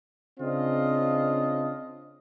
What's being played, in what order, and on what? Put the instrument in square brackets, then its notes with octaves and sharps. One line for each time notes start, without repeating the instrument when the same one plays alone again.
[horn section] C#3 C4 D4 F4 D#5